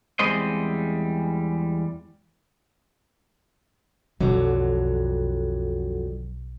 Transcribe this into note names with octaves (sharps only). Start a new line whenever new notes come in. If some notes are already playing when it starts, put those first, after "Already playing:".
E2 G3 G#3 C4 C5 D#5
B1 F2 D3 F#3